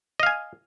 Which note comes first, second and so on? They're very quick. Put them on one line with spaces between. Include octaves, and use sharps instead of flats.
D#5 F5 G#5